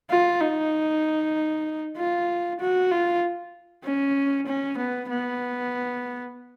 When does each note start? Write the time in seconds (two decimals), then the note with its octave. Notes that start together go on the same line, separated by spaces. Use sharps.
0.10 F4
0.41 D#4
1.97 F4
2.60 F#4
2.91 F4
3.84 C#4
4.47 C#4
4.77 B3
5.09 B3